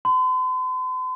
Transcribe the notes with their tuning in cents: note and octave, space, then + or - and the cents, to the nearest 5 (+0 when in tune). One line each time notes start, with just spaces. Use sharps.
C6 -45